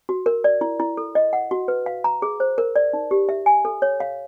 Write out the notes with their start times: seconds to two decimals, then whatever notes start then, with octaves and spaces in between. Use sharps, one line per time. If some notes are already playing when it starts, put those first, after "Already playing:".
0.09 F#4
0.26 A#4
0.44 D5
0.61 E4
0.79 E4
0.97 A4
1.15 D#5
1.33 F#5
1.51 F#4
1.68 B4
1.86 F5
2.04 A#5
2.22 G#4
2.40 C5
2.58 A#4
2.76 D5
2.93 D#4
3.11 G4
3.29 E5
3.46 G#5
3.65 A4
3.82 C#5
4.00 F5